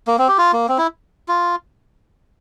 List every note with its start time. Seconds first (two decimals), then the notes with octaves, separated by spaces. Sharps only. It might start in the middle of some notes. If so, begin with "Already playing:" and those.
0.07 A#3
0.19 C4
0.28 G4
0.38 F4
0.53 A#3
0.69 C4
0.78 E4
1.28 F4